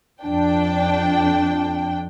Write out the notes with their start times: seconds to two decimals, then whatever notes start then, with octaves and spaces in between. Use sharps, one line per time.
0.24 F2 D4 G5